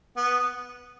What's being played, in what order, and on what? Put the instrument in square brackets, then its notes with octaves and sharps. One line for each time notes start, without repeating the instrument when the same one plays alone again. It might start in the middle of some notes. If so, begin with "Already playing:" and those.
[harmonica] B3